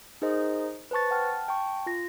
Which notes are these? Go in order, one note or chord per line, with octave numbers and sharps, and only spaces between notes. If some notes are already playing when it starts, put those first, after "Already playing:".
D#4 G#4 A#4 C5 D#5
B4 C5 A5 C#6 A6
F#5 G5 A5 F6
G5 A5 C#6
F4 A#6